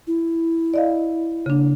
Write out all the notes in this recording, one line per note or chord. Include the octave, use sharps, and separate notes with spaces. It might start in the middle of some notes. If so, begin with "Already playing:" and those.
E4
D5 D#5 F5
C#3 A#3 D4